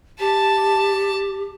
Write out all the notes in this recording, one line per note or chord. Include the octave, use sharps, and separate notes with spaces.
G4 A5